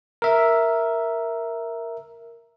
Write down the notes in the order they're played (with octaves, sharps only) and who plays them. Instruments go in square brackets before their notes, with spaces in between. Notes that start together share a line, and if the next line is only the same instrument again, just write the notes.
[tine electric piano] A#4 E5